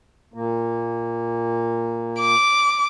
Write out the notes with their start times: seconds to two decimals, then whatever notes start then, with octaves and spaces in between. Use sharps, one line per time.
0.34 A#2 A#3
2.20 D6